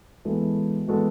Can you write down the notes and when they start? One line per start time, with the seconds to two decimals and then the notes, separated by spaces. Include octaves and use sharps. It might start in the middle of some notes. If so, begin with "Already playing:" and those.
0.25 E3 G#3 B3 F#4 A4
0.88 E3 G#3 B3 F#4 A4